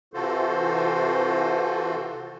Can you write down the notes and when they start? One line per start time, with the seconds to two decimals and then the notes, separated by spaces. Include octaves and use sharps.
0.14 C3 E3 F4 F#4 A4 C5